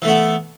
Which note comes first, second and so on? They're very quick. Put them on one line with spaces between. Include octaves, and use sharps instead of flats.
E3 A3 B3